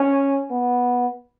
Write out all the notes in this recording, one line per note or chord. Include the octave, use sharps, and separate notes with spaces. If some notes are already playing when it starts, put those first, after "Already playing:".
Already playing: C#4
B3